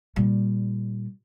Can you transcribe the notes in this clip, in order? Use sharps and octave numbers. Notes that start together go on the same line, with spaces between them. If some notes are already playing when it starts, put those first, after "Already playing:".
A#2 G3